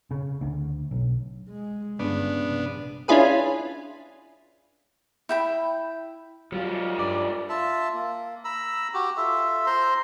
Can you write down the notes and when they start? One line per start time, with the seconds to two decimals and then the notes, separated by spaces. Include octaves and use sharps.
0.11 C#3
0.41 D2
0.91 B1
1.50 G#3
1.99 G1 G2 C#3 B3 D4
2.42 A#1 C3
3.08 C#4 D4 E4 F4 G#4 B4
5.29 E4 G5 B5
6.52 G#2 F#3 G3 F4
6.99 G2 D5
7.49 F4 E5 A5
7.93 A#3
8.45 A#5 B5 E6
8.94 F#4 G4
9.17 F4 A4 E5
9.66 C5 A#5 C6